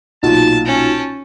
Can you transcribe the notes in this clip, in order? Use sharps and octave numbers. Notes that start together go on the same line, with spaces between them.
B1 A#2 F#3 D#4 F4 F#4 A5
C#4 G5 A5